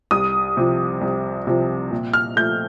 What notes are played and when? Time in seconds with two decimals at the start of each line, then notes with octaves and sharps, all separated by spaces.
0.11 C2 D#6
0.57 C3 F3
1.01 C2
1.47 C3 F3
1.91 A#2
2.13 F6
2.36 F3 A3 G6